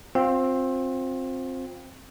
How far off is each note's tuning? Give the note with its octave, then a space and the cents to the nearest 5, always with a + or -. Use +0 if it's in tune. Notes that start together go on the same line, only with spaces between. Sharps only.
C4 +10 F4 +30